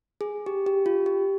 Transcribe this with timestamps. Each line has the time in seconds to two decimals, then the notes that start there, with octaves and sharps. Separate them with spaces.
0.21 G#4
0.46 G4
0.66 G4
0.86 F4
1.06 G4